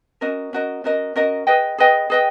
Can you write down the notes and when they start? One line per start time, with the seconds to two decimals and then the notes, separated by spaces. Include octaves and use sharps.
0.21 C#4 F#4 A#4 D#5
0.53 C#4 F#4 A#4 D#5
0.84 C#4 F#4 A#4 D#5
1.16 C#4 F#4 A#4 D#5
1.47 G#4 B4 D#5 G5
1.78 G#4 B4 D#5 G5
2.10 G#4 B4 D#5 G5